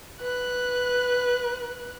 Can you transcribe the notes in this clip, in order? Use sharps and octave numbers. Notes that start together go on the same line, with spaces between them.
B4 F#6